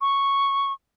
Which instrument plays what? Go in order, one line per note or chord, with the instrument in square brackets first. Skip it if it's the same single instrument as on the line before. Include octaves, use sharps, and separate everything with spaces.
[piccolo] C#6